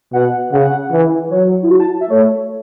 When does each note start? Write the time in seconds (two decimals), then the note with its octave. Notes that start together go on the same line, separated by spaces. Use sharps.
0.13 B2 F#5
0.52 C#3 F#5
0.91 E3
1.31 F#3 C#5
1.63 E4
1.71 F#4
1.80 A5
2.01 E5
2.10 A3 C#5